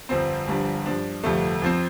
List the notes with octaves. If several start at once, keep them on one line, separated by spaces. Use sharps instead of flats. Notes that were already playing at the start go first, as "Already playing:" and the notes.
G1 F2 F3 C4
G1 G2 F3 D4
G2 F3 D4
G1 F2 C3 A3
F2 F3 C4